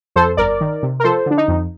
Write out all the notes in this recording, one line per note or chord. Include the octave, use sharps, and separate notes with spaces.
F2 A4 C5
G1 A#4 D5
D#3
C3
A#4
F3 A4 C5
D3 D4
D#4
F2